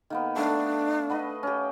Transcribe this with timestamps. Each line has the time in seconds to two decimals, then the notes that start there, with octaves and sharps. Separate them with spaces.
0.10 D#3 A#3 B3
0.37 A3 D4 F5
1.10 B3 B4 D#5
1.43 C#4 G4